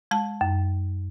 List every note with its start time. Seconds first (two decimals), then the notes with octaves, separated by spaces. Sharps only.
0.11 G#3 A5
0.41 F#2